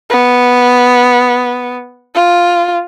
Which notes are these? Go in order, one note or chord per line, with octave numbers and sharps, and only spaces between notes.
B3
F4